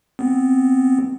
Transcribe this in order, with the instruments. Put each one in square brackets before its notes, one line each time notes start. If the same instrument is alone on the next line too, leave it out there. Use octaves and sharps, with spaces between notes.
[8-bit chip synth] B3 C4